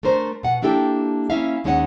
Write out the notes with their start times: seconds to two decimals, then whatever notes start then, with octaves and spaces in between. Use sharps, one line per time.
0.03 A3 D4 A#4 C5
0.43 B2 F#5
0.62 A#3 D4 E4 G4 A4 G5
1.30 A#3 C#4 E4 E5 F5
1.64 D#2 G#3 C#4 D#4 D5 F#5